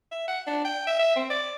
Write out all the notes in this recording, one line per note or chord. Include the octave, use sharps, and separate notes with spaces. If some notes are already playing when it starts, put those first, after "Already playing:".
E5
F#5
D4
G5
E5
E5
C4
D5